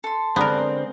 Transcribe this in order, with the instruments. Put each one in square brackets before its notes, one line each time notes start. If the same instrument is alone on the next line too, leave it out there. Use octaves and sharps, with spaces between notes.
[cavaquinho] A4 C6
[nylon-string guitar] D3 G#3 D5 [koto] B3 A#4 [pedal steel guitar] C4